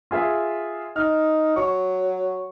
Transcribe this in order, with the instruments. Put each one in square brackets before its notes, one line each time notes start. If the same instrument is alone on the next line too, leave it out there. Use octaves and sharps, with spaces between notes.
[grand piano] F4 G#4 E5
[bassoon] D#4 [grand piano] F6
[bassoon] F#3 [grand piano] C#6